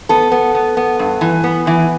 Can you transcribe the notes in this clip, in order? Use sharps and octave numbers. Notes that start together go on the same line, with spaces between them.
B3 A4
B3
B3
B3
G2
E3
B3
E3